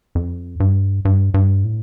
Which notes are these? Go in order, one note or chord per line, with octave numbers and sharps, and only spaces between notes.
F2
G2
G2
G2
A2